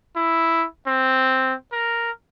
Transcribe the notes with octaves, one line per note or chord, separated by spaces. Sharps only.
E4
C4
A#4